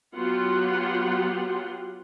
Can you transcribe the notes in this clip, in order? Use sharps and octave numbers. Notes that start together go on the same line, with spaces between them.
F#3 B3 F4 G4 F#5 C6